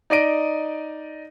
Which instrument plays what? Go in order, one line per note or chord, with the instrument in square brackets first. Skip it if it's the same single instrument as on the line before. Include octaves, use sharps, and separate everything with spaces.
[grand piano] D#4 D5 D#5 D7